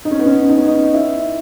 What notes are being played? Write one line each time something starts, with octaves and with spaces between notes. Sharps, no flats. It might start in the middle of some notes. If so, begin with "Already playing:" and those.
D#4
C#4
B3
C#4
D#4
C#4
D#4
E4